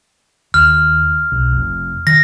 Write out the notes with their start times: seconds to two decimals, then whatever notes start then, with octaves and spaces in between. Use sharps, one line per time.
0.54 D#2 F6
1.32 B1
1.52 F1
2.07 D#3 A#6